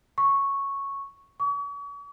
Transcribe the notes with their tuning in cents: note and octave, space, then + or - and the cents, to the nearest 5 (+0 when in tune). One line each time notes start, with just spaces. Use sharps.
C#6 -5
C#6 +40